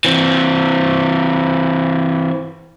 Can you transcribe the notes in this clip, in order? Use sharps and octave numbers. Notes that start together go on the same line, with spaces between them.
E3 C4